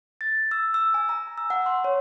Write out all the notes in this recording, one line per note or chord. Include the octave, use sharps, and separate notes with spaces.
A6
E6
E6
G#5
A#5
E6
F#5
C6
C#5